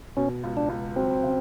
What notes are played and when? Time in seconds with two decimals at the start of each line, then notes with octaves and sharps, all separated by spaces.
0.17 B2 C#4
0.44 C#2
0.57 D4
0.70 C#2
0.96 F#3 C4
1.23 C#3